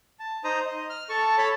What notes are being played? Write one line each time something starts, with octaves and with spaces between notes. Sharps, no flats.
A5
D#4 C5 A#5 D#6
D#5
F6
A4 A5 C#6
A4 C#5 A5 B5